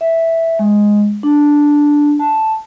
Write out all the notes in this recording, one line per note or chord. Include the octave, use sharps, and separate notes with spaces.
E5
G#3
D4
A5